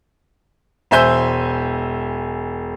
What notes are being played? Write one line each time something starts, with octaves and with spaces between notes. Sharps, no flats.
E1 C5 E5 G#5 E6 G6